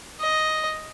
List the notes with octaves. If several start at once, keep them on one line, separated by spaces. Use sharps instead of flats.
D#5